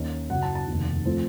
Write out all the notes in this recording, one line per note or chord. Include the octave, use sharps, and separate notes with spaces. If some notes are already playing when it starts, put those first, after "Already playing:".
Already playing: D#2 D#3 A#3 C#4
F#2 C#3 F#3 F#5
A5
A5
F1 D#2 D#3
F3 A3 C4